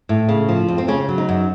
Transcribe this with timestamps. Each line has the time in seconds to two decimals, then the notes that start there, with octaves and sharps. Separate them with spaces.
0.09 A2
0.29 C#3
0.48 F3
0.68 F2
0.78 C4
0.88 C#3 C#4
1.09 F#3
1.18 D#4
1.29 F#2